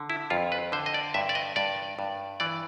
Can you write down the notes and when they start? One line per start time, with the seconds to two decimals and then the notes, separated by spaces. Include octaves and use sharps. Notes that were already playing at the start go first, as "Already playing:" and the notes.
Already playing: D3
0.10 E4
0.30 F2 F4
0.52 B4
0.72 D3 C5
0.86 D#5
0.94 D5
1.14 G2 E5
1.29 D5
1.35 D#5
1.56 G2 D5
1.99 G2
2.40 E3 D5